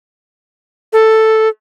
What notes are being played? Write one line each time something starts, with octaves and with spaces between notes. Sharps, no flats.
A4